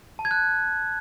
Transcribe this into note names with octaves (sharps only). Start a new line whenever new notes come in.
A5
G#6
F#6